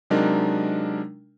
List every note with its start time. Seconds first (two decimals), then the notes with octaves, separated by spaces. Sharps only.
0.10 C3 F#3 G#3 D4 D#4 A#4